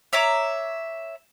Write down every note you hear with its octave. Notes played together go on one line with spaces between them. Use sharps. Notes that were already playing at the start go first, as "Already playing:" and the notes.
C#5 E5 A#5 D6